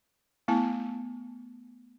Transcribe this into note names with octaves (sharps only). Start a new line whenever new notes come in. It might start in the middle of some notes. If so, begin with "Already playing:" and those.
A3 B3 E4 A5